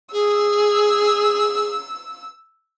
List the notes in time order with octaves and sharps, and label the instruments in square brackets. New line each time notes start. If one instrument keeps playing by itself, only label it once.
[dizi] G#4 [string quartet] E6